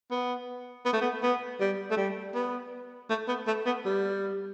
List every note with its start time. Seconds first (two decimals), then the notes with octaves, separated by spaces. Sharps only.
0.11 B3
0.85 B3
0.93 A3
1.01 B3
1.23 B3
1.60 G3
1.90 A3
1.97 G3
2.34 B3
3.10 A3
3.28 B3
3.47 A3
3.66 B3
3.85 G3